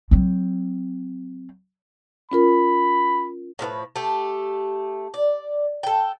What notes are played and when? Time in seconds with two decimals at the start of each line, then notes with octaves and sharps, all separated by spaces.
0.11 F#3 C4
2.32 C#4 F4 A#4 B5
3.59 A2 F3 F4 B4
3.96 A3 G4
5.14 D5
5.83 A4 G5